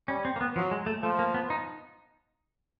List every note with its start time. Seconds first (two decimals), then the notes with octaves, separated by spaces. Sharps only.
0.08 G3 C#4
0.25 C4
0.36 A#3
0.41 B3
0.56 F3 F#3
0.71 G#3
0.86 A3
1.02 F3 A3
1.19 A#3
1.34 B3
1.50 D#4